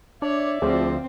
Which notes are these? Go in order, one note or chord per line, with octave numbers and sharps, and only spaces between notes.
D4 C#5 D5 E5
D2 F3 C4 G#4